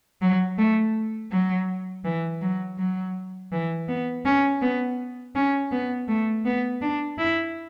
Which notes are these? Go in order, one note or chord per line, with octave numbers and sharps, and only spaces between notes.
F#3
A3
F#3
E3
F#3
F#3
E3
B3
C#4
B3
C#4
B3
A3
B3
D4
E4